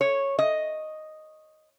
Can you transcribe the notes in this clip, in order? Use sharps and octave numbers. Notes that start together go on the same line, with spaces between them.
C#5
D#5